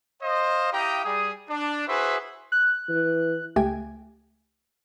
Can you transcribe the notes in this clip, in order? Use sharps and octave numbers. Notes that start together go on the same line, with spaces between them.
C5 D#5 F5
E4 G4 F5 G5 A#5 D#6
G3 G#4 D#6
D4
E4 F#4 G#4 B4 C5 E5
F#6
E3
C#2 A3 G4 G5 G#5 G#6